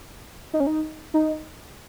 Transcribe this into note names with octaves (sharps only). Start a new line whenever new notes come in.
D#4
C#4
D#4
D#4